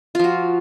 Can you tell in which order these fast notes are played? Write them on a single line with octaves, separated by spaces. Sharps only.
F4 F3 F#4